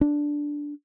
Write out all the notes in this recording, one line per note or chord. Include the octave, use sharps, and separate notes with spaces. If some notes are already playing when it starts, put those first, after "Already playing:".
D4